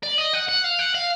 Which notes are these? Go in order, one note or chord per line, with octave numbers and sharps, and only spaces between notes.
D5
D#5
F#5
F#5
F5
F#5
F5